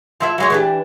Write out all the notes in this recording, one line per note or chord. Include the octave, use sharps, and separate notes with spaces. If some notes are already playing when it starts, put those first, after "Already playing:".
F3 E4 E5
F#3 G#3 C#5
E3 D4 G4